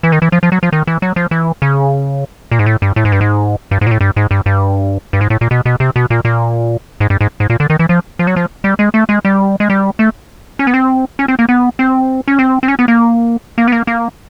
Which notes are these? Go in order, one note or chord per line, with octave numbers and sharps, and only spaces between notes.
E3
D#3
E3
F3
F3
F#3
F3
D#3
E3
F#3
F3
E3
C#3
A#2
G#2
A2
G2
A2
G#2
G2
G#2
G2
G#2
A#2
A2
G2
G#2
G2
G2
G2
G#2
A2
A#2
B2
B2
C3
B2
A#2
A#2
G#2
G2
G#2
G#2
A#2
D3
D#3
E3
F3
F3
F#3
F3
G3
G#3
A3
G#3
G3
G#3
G3
A3
C#4
B3
C4
C#4
C4
A#3
B3
C4
C#4
C4
C4
C#4
B3
A#3
A#3
B3
A#3
A#3